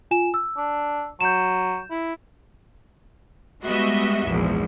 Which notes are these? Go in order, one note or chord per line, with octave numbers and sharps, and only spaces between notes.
F4 G#5 E7
E6
D4
F#3 G6 E7
E4
G3 G#3 B3 F#4 D#5 E5
A#1 E2 G#2